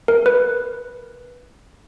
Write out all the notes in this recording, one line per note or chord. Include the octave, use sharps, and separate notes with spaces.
A#4
B4